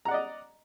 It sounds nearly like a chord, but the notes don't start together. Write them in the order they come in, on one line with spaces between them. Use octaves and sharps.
A#5 F#5 D5 D#5